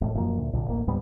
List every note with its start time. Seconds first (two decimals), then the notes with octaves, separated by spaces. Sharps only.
0.01 E1 A2
0.15 E1 F#2 F3 A#3
0.37 D2 A#2
0.53 B1 A#2 D3
0.67 D1 A1 A#3
0.87 D2 G#2 G3 B3